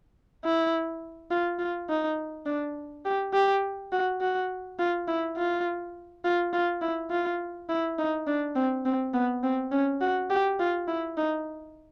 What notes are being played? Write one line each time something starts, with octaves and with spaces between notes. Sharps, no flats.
E4
F4
F4
D#4
D4
G4
G4
F#4
F#4
F4
E4
F4
F4
F4
E4
F4
E4
D#4
D4
C4
C4
B3
C4
C#4
F#4
G4
F4
E4
D#4